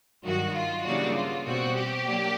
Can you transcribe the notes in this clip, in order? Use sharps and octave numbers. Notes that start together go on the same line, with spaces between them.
G2 D#3 F#3 F#4
F4
C#3 E3 G3 A#3 D4 F#4
F4
B2 G3 C4 F#4
G4
F#3 A#3 D4